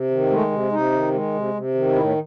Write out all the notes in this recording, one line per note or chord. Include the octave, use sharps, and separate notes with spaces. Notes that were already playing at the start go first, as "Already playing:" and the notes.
Already playing: C3
D#3
G#3 A3
C3
C3 D#4
D#3
G#3
C3
C3
D#3
A2 E4